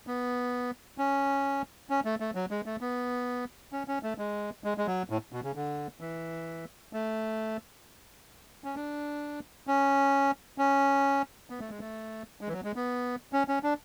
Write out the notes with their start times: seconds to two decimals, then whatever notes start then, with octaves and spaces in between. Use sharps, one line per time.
0.07 B3
0.98 C#4
1.90 C#4
2.05 A3
2.20 A3
2.35 F#3
2.51 G#3
2.66 A3
2.81 B3
3.72 C#4
3.88 C#4
4.03 A3
4.18 G#3
4.64 G#3
4.78 G#3
4.87 F#3
5.10 A2
5.33 B2
5.44 C#3
5.55 D3
6.01 E3
6.93 A3
8.64 C#4
8.76 D4
9.67 C#4
10.58 C#4
11.50 B3
11.60 A3
11.70 G#3
11.80 A3
12.41 G#3
12.48 E3
12.53 F#3
12.64 G#3
12.76 B3
13.33 C#4
13.48 C#4
13.63 D4